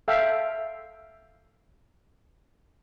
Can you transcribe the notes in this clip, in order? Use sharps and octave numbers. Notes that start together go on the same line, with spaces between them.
A4 E5 F5 G5